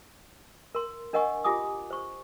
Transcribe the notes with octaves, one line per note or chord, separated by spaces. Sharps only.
A#4 C6
D4 A#4 D#5 F#5 G#5 C#6
F4 G4 G#5 D6 D#6
C5 C#6